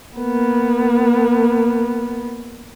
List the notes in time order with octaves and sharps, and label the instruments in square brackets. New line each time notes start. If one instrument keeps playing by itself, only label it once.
[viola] A#3 B3